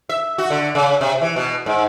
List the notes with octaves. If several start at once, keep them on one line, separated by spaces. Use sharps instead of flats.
E5
F#4
D3
C#3
C3
E3
B2
G#2